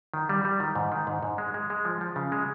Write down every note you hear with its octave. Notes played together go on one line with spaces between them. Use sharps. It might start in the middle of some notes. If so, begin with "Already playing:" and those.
D#3
G3
G3
D#3
G#2
D#3
G#2
G#2
G#3
G#3
G#3
F3
F3
C#3
G#3